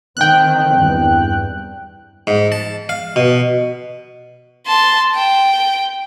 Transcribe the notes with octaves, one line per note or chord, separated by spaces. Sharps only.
D#3 C4 G5 F#6
E2 G2
G#2
A5
F5
B2
A5 C6
G5